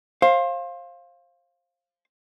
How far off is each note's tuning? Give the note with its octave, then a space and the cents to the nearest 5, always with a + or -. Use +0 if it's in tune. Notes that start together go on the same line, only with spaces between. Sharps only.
C5 +30 F5 +0